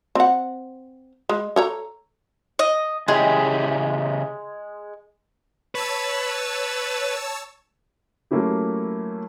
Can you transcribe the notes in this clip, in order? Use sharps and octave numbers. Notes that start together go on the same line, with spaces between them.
C4 F#5
G#3
A4 C#5 A#5
D#5
C#3 G#3 E4 G4 G#4
B4 C#5 A5 E6
F#3 A3 A#3 C#4 E4 G4